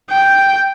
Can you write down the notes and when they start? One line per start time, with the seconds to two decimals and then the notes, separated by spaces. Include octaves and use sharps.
0.10 G5